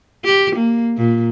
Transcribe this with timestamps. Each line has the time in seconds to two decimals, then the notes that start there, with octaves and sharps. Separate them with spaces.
0.24 G4
0.55 A#3
0.97 A#2